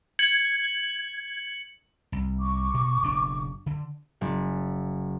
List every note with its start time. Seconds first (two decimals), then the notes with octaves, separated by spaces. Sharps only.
0.19 G#6 C#7 F#7
2.12 C2
2.41 C#6 D6
2.74 B2
3.02 F#1 B2 D4
3.66 D3
4.21 F#1